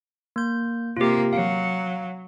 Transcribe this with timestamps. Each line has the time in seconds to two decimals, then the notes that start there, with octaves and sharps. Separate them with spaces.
0.36 A#3 G6
0.97 C3 A#3 F4 G4
1.33 F#3 F5